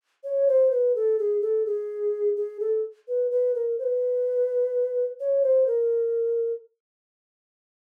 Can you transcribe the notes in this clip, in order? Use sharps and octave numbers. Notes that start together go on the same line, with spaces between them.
C#5
C5
B4
A4
G#4
A4
G#4
G#4
A4
B4
B4
A#4
C5
B4
C#5
C5
A#4